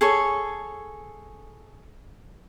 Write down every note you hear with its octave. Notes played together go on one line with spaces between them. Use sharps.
G#4 A4 C#5